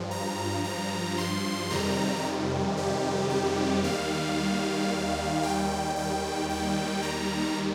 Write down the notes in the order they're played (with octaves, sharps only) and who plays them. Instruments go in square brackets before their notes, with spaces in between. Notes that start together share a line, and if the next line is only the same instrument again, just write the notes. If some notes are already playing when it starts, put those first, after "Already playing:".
Already playing: [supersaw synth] G2 F3
A#5
A#5
C6
F2 C3 D#3 G3 A#5
G4
G4
D#2 D#3 G3 F5
G5
D#2 D#3 G3 G5
G5
A#5